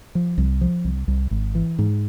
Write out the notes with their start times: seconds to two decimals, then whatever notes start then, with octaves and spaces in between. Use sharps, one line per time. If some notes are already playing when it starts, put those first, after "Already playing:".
0.15 F3
0.38 C2
0.61 F3
0.84 C2
1.08 C2
1.31 G#1
1.55 E3
1.79 G#2